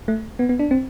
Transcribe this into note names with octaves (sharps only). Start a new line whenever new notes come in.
A3
B3
B3
D4
C4